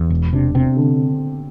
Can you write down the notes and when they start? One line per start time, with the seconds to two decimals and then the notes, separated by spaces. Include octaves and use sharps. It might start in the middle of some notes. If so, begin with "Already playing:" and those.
Already playing: E2
0.10 E1
0.33 C3 D4
0.55 C3 C4
0.77 D3